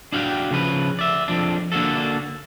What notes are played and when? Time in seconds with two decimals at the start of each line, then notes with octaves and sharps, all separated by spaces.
0.12 D4 E4 F#4 G4 F5 G5
0.51 C#3 F3 B4
0.99 D5 E5
1.28 F2 B2 F3 D4
1.72 D3 A#3 D4 F#4 A4